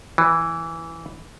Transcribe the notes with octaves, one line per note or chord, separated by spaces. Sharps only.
E3